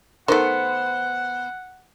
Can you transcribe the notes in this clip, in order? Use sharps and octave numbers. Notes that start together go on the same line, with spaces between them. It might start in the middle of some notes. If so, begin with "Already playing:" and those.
D#3 A3 B3 C5 F#5